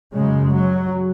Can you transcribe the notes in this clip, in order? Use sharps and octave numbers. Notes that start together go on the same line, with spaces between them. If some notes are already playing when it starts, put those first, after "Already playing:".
F#2 C#3 G#3
F#3